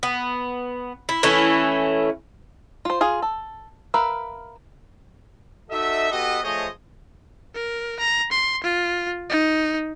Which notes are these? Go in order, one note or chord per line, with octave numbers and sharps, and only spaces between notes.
B3
E4
E3 A3 C#4 E4
F4 C5
F4 G#4 F5
A4
A#4 B4 E5 F5
D#4 F#4 A4 D#5 E5
B3 F#4 G4 A4 B4 D#5
F3 A3 G#4 C5 C#5 D#5
A#4
A#5
C6
F4
D#4